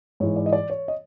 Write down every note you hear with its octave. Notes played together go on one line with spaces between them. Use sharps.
G#2 E3 C#5
D5
D#5
D5
C#5
D#5